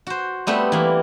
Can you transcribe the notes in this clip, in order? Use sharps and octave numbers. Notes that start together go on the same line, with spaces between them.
F#4 C5
G3 A3 B3 C4 G4
E3 A#3